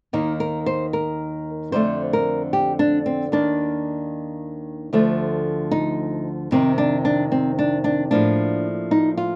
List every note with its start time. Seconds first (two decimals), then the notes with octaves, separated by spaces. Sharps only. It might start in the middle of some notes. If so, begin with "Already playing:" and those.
0.13 D#2 D#3 A#3 D#4
0.40 A#4
0.66 C5
0.93 A#4
1.72 F2 D3 A3 C5
2.13 A#4
2.53 G4
2.79 D4
3.06 C4
3.32 D#2 D#3 A#3 D4
4.93 D2 D3 F3 A3
5.71 D#4
6.52 F2 C3 D#3 C4
6.78 D4
7.05 D4
7.32 C4
7.59 D4
7.84 D4
8.11 A2 F3 A#3 D4
8.91 D#4
9.17 F4